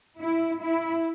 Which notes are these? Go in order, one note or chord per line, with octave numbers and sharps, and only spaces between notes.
E4
E4